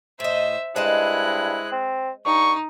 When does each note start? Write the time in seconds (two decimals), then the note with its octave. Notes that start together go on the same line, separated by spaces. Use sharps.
0.20 A2 C5 D#5 E5
0.76 G2 G#3 E4 C5 D#5 A5 F#6
1.72 C4
2.26 G2 D#4 C#6